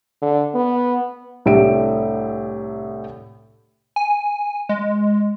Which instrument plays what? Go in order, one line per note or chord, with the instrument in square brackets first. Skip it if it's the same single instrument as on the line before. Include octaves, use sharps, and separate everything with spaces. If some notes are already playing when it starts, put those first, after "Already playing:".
[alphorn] D3
B3
[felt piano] C2 A2 A3 D4 E5 D7
[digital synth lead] G#5
G#3